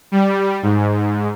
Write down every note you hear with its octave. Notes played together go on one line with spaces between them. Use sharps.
G3
G#2